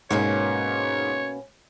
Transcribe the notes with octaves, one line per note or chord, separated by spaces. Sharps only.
G#2 B2 A#3 C#4 C#5